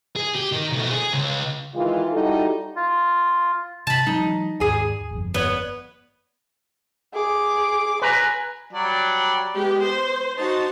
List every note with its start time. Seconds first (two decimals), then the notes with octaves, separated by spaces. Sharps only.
0.16 G#4
0.35 G4
0.52 D#3
0.72 B2 A3
0.90 G#4
1.13 C#2
1.75 D#3 E3 G#3 F4
2.12 G3 D#4 E4 F#4 A4
2.76 F4
3.87 C3 A5 B5
4.07 E3 F#3 G#3 D#4
4.60 D#2 G#2 G#4 G#5
5.11 G1 F2
5.34 B3 B4 C#5
7.13 G#4 D6
8.02 B4 G#5 A#5
8.73 F#3 G3 D5
9.56 G#3 B3 G4
9.85 C5
10.38 D#4 F#4 C5 A5